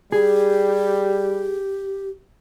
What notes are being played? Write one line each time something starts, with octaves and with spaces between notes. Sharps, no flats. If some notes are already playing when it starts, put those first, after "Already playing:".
G3 G4 G#4